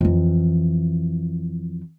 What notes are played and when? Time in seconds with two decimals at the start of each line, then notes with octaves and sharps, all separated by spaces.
0.01 F2 E3